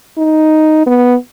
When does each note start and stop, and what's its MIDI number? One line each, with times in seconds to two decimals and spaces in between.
0.18 0.82 63
0.86 1.15 59